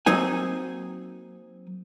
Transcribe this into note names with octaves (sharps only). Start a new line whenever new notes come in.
F#3 A#3 C4 D#4 G#5